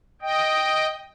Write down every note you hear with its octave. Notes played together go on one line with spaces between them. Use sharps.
D#5 G5